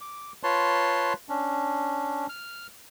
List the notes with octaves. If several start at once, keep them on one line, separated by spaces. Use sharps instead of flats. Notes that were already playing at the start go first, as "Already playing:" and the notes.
D6
F4 B4 C#5 A5 C6
C#4 D4
F6